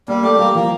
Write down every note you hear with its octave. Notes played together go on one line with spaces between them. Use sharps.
G3 A#3
A3 G4
G3 A#3
F3 A#3